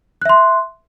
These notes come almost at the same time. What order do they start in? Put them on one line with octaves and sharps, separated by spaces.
F#6 E5 C6